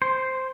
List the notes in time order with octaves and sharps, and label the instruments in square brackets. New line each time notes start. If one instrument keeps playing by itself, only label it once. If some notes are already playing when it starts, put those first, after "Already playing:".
[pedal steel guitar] C5